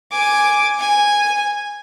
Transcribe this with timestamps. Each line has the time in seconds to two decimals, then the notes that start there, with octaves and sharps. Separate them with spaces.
0.12 G#5 D6
0.79 G#5